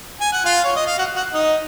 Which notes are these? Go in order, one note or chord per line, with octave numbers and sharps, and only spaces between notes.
G#5
F#5
F4 F5
C#5
D#5
F5
F#4 F#5
F#4 F#5
D#4 D#5